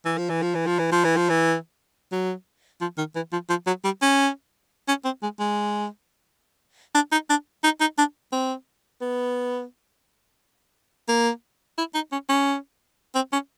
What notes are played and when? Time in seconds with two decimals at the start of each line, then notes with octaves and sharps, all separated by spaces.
0.05 E3
0.18 F3
0.29 E3
0.42 F3
0.55 E3
0.67 F3
0.79 E3
0.91 F3
1.04 E3
1.17 F3
1.29 E3
2.12 F#3
2.81 F3
2.98 D#3
3.15 E3
3.32 F3
3.49 F3
3.67 F#3
3.84 G3
4.02 C#4
4.88 C#4
5.05 C4
5.23 G#3
5.39 G#3
6.94 D4
7.12 D#4
7.30 D4
7.64 D#4
7.80 D#4
7.98 D4
8.32 C4
9.01 B3
11.08 A#3
11.78 E4
11.94 D#4
12.12 C#4
12.29 C#4
13.15 C4
13.33 C#4